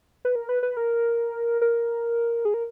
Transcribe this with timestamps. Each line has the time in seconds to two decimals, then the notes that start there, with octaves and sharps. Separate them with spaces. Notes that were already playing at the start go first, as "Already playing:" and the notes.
0.25 B4
0.35 A#4
0.49 B4
0.63 B4
0.77 A#4
1.61 A#4
2.45 G#4
2.54 A#4